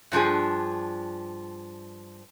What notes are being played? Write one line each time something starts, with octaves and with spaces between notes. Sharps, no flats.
G2 F3 D4 G#4